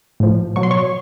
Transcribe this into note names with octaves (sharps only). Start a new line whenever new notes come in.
A2 F3
B2 F#3 C#6
C6
C#5 C#6